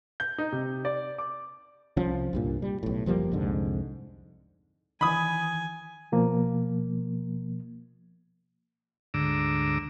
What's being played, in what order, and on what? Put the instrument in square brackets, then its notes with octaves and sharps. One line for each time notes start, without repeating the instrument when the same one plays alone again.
[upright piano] G6
D#4
C3
D5
D6
[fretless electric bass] C2 F3 C#4
C2 G2 A#2
G3
B1 A2
F#1 F3 G3 A#3
C2 F2 G#2 D3
[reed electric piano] D#3 E3 [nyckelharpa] G#5 [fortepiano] B5 D#6
[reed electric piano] B2 F3 A#3
[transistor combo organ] D2 G#2 D3 A#5 D6 E6